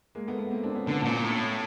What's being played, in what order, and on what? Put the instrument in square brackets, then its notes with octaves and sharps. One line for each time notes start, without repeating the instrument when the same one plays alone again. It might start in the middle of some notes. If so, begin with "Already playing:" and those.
[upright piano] G#3 A#3
A3 B3
A3 B3
A#3 C4
C4 D4
B3 C#4
[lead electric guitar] D3 [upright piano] B3 C#4
[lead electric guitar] A2
A#2
A2